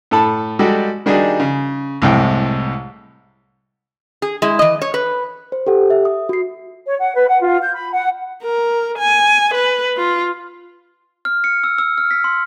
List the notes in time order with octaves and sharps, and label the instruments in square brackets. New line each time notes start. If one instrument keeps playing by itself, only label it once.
[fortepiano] A2 A4 A5 B5
G3 G#3 F#4 G4 A4
D#3 G3 D4 D#4 F#4 G#4
C#3
C2 A2 C3 G#3 G5
[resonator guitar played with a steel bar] G#4
G#3 E4
E3 D#5
C#5
B4
[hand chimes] C5
G4 A4 F#5
E5
D#6
F#4 C7
[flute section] C#5
F#5
B4
F#5
F4
G6
B5
F#5
[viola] A#4
G#5
B4
F4
[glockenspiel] F6
C#7
E6
E6
F6
B6
C6